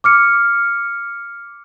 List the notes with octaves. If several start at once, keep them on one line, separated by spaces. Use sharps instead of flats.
D6 F6 C#7